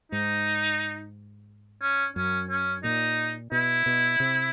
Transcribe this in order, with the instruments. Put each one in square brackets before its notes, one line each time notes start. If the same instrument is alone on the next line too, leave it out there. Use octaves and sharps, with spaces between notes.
[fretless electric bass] G#2 [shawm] D#4
[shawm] C#4
[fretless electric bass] F#2 [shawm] C#4
[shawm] C#4
[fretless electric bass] A#2 [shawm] D#4
[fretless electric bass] B2 [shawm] E4
[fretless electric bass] B2
C3